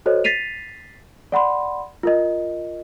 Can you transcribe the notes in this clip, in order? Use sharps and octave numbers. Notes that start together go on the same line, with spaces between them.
F#4 A4 C5 C#5 D#5
A6 B6 C7 D#7 F7
D5 F#5 B5 C6
F4 A#4 D#5